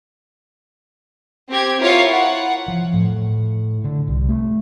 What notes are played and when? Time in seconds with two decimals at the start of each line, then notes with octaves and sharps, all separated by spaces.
1.49 C4 G4 G#6
1.80 E4 F4 A#4 C#5 F5 F#5
2.12 F#5
2.68 F3
2.94 A2
3.84 D3
4.08 C2
4.29 A3